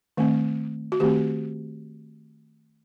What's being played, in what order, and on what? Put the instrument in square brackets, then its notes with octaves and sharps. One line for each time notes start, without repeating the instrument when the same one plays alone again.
[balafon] D#3 A3 C4
F#4
D#3 A3 C4 G4